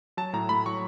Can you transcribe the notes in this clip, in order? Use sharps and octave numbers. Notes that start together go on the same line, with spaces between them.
F#3 A5
A2 A#5
A2 B5
F#3 C#6